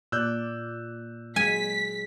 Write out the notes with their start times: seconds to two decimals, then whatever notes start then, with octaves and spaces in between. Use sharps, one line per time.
0.12 A#2 D5 E6 F#6 G6
1.36 F#3 G#3 G#5 B6